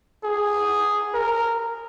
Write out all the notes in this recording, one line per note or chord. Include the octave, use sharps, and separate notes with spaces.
G#4
A#4